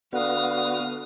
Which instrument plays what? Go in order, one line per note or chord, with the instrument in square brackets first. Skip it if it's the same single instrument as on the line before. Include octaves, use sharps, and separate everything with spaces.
[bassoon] D3 [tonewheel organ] B3 F#4 [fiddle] F5 D#6